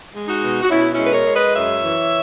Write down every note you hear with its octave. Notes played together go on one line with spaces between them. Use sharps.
G#3
D#4 F#4
B2
F#4
B2 C#4 E4
C#4 E4
G#3
B4
A#4 C#5
G#3
B4 D#5
F#2 C#5 E5
E3